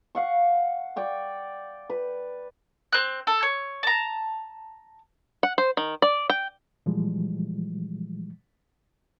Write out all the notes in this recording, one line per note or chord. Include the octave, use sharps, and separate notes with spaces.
F5 F#5 C#6
D5 G5 C#6
B4
C4 F#6
A4
C#5
A5 A#5
F#5
C5
D#3
D5
G5
A#2 E3 F3 G3 G#3